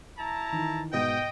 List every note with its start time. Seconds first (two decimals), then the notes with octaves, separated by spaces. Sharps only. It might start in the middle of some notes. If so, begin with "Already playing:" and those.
0.18 E4 A5 A#5
0.52 D#3 E3
0.93 G#2 B2 B3 D#5 G5